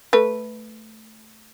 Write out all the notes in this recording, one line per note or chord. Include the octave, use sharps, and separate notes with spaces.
A3 B4